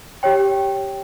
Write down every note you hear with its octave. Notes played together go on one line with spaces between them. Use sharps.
G4 C#5 G5